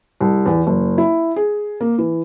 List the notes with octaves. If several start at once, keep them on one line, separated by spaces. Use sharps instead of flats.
C2
E2
F#1
E4
G#4
A#3
E3